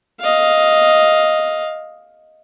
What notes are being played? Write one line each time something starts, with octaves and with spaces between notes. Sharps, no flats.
D#5 F5